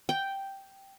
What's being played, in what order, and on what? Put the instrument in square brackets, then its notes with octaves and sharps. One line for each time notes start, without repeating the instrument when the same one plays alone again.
[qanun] G5